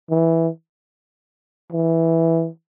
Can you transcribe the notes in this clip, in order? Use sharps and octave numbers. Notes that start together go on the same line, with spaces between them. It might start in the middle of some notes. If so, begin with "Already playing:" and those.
E3
E3